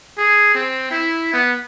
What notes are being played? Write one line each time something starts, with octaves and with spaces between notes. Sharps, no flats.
G#4
C4
E4
B3